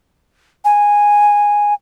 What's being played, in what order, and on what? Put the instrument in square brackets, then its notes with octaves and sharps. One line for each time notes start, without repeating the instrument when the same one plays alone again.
[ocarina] G#5